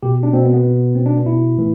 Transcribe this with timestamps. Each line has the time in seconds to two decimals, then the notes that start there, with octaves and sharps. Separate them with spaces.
0.03 B2 G4
0.23 D4
0.33 B2 C4
0.44 B3
0.54 B3
0.64 B2
0.95 B2 C4
1.06 D4
1.17 B3
1.26 B2 E4
1.57 A2 E3